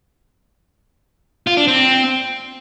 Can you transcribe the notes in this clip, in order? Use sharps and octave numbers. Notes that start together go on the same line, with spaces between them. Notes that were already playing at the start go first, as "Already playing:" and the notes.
F4
D4
C4